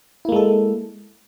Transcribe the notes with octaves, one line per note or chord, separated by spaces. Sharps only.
G#3 A#3 E4 A4